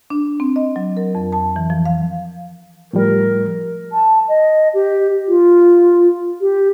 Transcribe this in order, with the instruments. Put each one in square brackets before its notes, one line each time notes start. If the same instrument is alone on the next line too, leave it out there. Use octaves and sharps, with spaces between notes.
[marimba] D4
C4
D#5
F#3
A#4
F2
A5
E3
F3
F5
[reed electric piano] A2 F3 G3 [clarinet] A#4
[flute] A5
D#5
G4
F4
G4